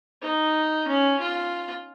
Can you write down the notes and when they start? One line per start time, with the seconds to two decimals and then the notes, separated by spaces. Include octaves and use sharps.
0.22 D#4
0.87 C#4
1.20 F4